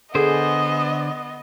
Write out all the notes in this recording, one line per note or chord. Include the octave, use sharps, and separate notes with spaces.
D3 B3 G#4 A4 C5 D#5 G#5